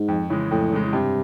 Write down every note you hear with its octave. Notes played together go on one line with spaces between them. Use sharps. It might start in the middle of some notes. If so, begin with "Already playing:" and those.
Already playing: G#2
F2
C#3 E3 G#3
F2 A2
C#3 E3 G#3
G2 C3